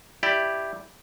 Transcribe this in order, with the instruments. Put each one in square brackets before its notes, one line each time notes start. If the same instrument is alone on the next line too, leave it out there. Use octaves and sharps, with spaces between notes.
[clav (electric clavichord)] E4 G4 D5